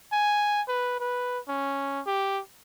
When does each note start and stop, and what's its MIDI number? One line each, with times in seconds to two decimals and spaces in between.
0.12 0.62 80
0.68 0.97 71
1.00 1.39 71
1.48 2.01 61
2.06 2.40 67